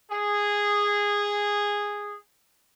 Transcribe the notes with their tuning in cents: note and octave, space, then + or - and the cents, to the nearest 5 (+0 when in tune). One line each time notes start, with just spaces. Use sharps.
G#4 -10